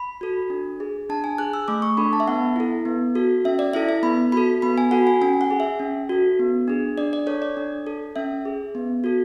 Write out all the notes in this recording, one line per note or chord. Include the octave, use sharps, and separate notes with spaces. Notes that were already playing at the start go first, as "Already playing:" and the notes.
Already playing: B5
F#4 A4
D4
G#4
D4 A5
G#5
G#4 F#6
E6
A3 D6
C#6
D4 A4 B5
A5
E5
B3 F#5
E4 A4
B3
F#4 A4
C#4 E5
D5
E4 A4 E5
E5
B3 B5
F#4 A4 B5
B3 B5
G#5
F#4 A4 F#5
G#5
C#4 G#5
F#5
G#4
E5
C#4
F#4 A4
B3
D4 G#4
D4 D5
D5
A4 C#5
D5
D4
A4
C#4 E5
G#4
B3
F#4 A4